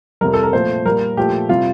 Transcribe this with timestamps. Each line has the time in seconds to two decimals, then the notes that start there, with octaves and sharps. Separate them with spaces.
0.21 F2 C3 G3 A#4
0.34 A4
0.43 A#4
0.53 A#2 F3 A3 C5
0.85 A#2 G3 A#4
1.17 A#2 F3 A3 G4
1.49 C3 G3 F4